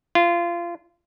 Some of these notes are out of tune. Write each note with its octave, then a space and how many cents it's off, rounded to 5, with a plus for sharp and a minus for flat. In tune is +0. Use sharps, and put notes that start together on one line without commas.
F4 -25